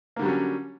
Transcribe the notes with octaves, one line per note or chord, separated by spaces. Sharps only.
D3 F#3 G3 A#3 C#4